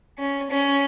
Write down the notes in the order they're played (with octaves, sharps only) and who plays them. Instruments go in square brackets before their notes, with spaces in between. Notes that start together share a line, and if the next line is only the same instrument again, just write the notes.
[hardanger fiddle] C#4
C#4